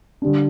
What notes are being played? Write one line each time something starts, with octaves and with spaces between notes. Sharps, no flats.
D3 G3 D4